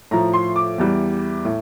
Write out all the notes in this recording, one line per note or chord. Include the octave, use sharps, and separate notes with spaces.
A2 F3 A#5
C6
D6
E2 E3 G3
A2